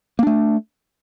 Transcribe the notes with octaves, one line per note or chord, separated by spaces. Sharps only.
A3 A#3 D4